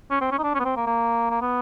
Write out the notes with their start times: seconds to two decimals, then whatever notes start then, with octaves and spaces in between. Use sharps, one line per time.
0.11 C#4
0.21 C4
0.32 C#4
0.39 D#4
0.43 D4
0.55 C#4
0.60 B3
0.65 C4
0.76 A#3
0.87 A#3
1.31 A#3
1.41 B3